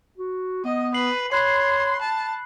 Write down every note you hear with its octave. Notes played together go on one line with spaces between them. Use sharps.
F#4
B3 D#5
B4 C7 F#7
C#5 B5 C6 F#6 C7
A5